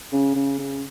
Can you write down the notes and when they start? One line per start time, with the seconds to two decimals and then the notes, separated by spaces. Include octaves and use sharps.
0.12 C#3
0.35 C#3
0.59 C#3